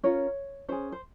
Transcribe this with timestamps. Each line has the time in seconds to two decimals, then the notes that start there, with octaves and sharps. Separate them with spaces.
0.03 C#4 F4 A#4 C#5
0.68 C#4 G#4 C5
0.92 C5